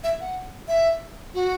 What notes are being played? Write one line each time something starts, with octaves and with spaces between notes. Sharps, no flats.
E5
F#5
E5
F#4